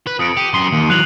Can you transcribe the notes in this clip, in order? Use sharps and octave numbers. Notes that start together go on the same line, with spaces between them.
B4
F2 D#6 C#7 D7
G4 C#7 D#7
F#2 C6 D#6 C7
D#2
E3 F#3 F#6 F7 F#7